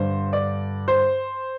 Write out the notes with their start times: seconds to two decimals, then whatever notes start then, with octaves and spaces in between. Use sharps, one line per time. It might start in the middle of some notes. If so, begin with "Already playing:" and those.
Already playing: G2 D3 C5
0.33 D5
0.88 C5